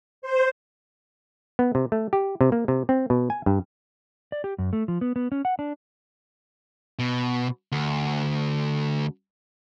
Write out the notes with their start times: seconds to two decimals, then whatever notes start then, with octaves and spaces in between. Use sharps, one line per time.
0.22 C5
1.59 B3
1.75 C3
1.92 A3
2.13 G4
2.41 C3
2.52 A#3
2.68 C3
2.89 C4
3.10 B2
3.30 G#5
3.46 G2
4.32 D5
4.44 G4
4.58 F#2
4.73 A3
4.88 F3
5.01 B3
5.16 B3
5.32 C#4
5.45 F#5
5.59 D4
6.99 B2
7.72 D2